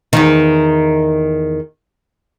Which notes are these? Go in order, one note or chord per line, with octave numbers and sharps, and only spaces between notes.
E2 D#3